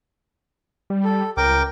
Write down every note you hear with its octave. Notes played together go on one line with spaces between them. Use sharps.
G3
A4
C#2 A#4 G5 D6